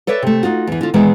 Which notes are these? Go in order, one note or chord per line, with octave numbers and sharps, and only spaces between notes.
A4 B4 C#5 D5 E5
C3 A3
D#4 F4 F#4
E2 E3
D3 F4
A#2 D#3 E3 G#3 B3